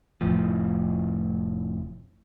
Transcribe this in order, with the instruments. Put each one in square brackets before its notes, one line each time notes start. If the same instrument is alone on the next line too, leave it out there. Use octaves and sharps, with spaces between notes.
[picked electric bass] F1 A2 F3